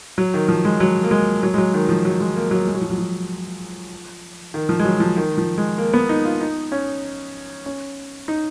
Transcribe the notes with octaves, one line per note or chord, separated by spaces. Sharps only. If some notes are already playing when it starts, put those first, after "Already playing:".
F#3
D#3
F3
G#3
F#3
A#3
G#3
F#3
G#3
F#3
D#3
F3
F#3
G#3
A#3
F#3
G#3
F#3
F3
F#3
F3
D#3
F3
G#3
F#3
F3
D#3
F3
G#3
A#3
B3
D#4
F4
D#4
C#4
C#4
D#4